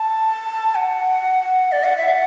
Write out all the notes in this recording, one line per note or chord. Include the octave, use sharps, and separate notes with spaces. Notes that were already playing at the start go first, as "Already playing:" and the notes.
Already playing: A5
F#5
D5
F#5
E5
F#5